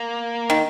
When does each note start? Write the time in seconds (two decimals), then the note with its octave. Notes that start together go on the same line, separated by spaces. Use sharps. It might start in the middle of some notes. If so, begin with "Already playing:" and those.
Already playing: A#3
0.50 D#3